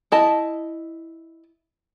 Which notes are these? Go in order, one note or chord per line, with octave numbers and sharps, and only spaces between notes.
E4 D#5 A5